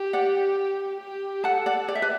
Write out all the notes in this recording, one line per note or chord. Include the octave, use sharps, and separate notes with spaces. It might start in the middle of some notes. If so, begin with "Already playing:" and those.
Already playing: G4
D5 F#5
G4
A4 F#5 A5
D5 F#5
G4 D5
E5
B4 D5